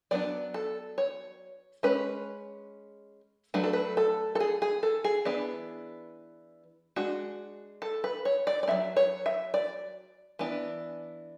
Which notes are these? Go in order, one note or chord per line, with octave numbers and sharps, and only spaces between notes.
F#3 B3 D4 D5
A4
C#5
G#3 C#4 B4
F#3 A3 D4 B4
A4
B4
A4
A4
G#4
G#4
A4
G#4
E3 B3 D4
G#3 D4 F#4
A4
B4
C#5
D5
D5
F#3 C#4 E5
C#5
E5
D5
E3 B3 D4